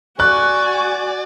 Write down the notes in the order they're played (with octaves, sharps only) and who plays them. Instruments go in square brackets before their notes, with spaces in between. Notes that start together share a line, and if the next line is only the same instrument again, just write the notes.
[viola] F#4 G#5 [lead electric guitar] D5 [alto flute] C#6 [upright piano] F#6